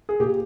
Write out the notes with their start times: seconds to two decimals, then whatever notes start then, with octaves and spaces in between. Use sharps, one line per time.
0.09 G#4
0.20 A#2 G4